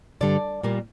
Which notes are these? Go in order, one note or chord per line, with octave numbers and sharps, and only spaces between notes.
G2 D3 G3 D5
A#2 G3 A#3